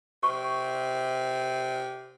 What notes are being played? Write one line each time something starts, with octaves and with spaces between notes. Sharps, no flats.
C3 C#6